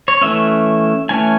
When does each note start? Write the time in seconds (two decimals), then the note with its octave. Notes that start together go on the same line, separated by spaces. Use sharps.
0.08 C#5
0.21 E3 A3 C#4 E5
1.09 E3 A3 C#4 G#5